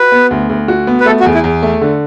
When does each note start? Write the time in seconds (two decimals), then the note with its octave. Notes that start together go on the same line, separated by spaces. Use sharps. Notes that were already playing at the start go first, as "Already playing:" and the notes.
Already playing: F#4 B4
0.12 B3
0.31 D2
0.49 D2
0.68 F#4
0.87 B3
1.00 B4
1.06 A3 A4
1.20 F#4
1.26 E2
1.34 E4
1.44 E2
1.63 A3
1.81 D3